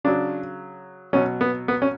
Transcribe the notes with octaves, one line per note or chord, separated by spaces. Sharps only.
C#3 F#3 D4
B2 F#3 C#4
B3
B3
C#4